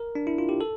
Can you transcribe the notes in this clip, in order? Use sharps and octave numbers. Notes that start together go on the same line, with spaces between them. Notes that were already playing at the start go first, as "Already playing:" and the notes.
Already playing: A#4
D4
E4
F4
G4
A4